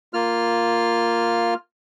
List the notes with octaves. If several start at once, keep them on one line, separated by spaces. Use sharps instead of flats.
A#3 F4 F6